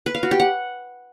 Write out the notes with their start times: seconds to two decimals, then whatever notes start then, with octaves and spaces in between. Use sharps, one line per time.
0.06 B4
0.15 F5
0.23 F#4
0.31 G4
0.40 F#5